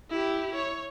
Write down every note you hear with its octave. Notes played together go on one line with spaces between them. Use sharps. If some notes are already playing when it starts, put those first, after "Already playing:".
E4 G4
C#5